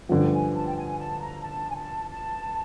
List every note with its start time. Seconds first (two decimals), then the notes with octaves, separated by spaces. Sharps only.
0.09 G2 D3 F3 G5
0.33 G#5
0.54 A5
0.66 G5
0.77 G#5
0.98 A5
1.21 A#5
1.42 A5
1.70 G#5
1.75 A5
2.09 A5